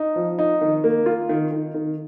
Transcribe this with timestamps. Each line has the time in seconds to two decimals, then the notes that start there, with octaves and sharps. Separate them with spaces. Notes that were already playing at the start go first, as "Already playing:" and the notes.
Already playing: D#4
0.16 F3
0.39 D#4
0.61 D#3
0.84 A#3
1.06 F4
1.29 D#3
1.51 D#3
1.74 D#3